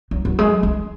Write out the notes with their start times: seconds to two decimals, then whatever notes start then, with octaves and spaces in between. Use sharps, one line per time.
0.11 F#3
0.25 F#3
0.39 G#3
0.63 G#3